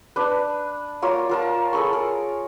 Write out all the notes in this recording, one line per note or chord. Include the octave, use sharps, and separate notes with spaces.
D4 B4
A#3 F4 A#4 C#5
F4 A#4 A5
G#4 A4 B5 C#6
A#4